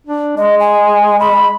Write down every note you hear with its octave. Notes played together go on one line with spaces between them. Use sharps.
D4
G#3 D#5
G#5
B5